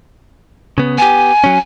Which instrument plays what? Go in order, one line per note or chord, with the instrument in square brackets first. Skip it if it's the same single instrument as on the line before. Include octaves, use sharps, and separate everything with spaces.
[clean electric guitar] C#3 B3
[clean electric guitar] B3 G4 [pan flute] G#5
[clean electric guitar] F#3 C#4